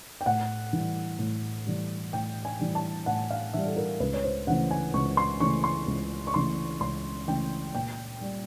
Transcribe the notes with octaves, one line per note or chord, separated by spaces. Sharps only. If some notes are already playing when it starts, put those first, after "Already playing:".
G5
A2 F#5
E3 G3
A2
E3 G3
A2 G5
G#5
E3 G3
A5
A2 F#5
F5
E3 G3 E5
A4
A#4
C#2 B4
C#5
C5
C#3 E3 A3 F#5
G#5
C#2 C#6
C6
C#3 E3 A3 C#6
C6
C#2
C#6
C#3 E3 A3 C6
C#2 C6
C#3 E3 A3 G5
A#2 G5
G3